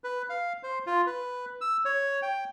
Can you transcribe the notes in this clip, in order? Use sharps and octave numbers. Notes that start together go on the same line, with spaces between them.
B4
F5
C5
F4
B4
E6
C#5
G5